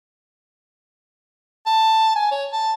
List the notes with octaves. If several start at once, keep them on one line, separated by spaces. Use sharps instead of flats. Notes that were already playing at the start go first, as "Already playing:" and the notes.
A5
G#5
C#5
A5